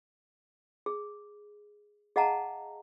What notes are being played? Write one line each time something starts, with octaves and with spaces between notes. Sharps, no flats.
G#4
G#4 D#5 F5 F#5 A5 A#5